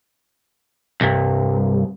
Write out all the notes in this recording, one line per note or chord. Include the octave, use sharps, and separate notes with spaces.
C2 G2